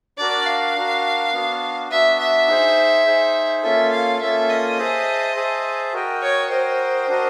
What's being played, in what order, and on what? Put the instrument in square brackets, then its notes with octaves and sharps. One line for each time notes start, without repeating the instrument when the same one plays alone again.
[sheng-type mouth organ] D4 F#4 A#4 [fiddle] D5
[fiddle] F5
[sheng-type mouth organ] D4 F#4 A#4
B3 D4 F#4
[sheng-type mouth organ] B3 D4 F#4 [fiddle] E5
[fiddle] E5
[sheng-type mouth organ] D#4 G#4 C5
D#4 G#4 C5
[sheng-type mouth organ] A#3 C#4 F4 A4 [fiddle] E5
[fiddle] F5
[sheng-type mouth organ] A#3 C#4 F4 A4 [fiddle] E5
[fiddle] D#5
[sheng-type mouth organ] G#4 C5 E5 A5
G#4 C5 E5 A5
F#4 A#4 D#5 G5
[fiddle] C#5
[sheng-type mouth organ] F#4 A#4 D#5 G5 [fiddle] C5
[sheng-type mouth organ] D4 F#4 A#4 D#5